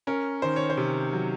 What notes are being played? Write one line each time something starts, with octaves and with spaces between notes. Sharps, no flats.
C#4 A#4
D#3 C5
C#5
C5
C3
F#3